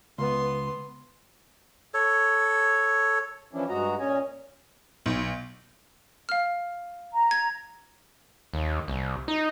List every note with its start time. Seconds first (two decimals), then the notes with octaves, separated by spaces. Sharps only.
0.18 C#2 B3 C6
1.94 A4 C#5
3.53 E3 F3 C#4 D4 E4
3.69 G2 G#3 F#4 D#5 A#5
4.00 A#2 C#4 C#5 D#5 G#5
5.06 B1
6.29 F5 F6
7.12 A#5
7.31 G#6
8.54 D#2
8.88 C2
9.28 D#4